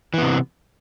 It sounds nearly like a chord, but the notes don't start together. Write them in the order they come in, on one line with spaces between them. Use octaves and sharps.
E3 B3 C3